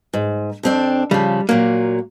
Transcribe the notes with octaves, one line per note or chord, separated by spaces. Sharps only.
G#2
F2 C4 D4
C#3 F3 G3
A#2 F#3 A#3